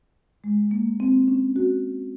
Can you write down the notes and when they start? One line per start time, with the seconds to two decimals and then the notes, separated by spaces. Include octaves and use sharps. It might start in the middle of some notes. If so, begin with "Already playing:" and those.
0.44 G#3
0.71 A#3
1.00 C4
1.28 C#4
1.56 F#4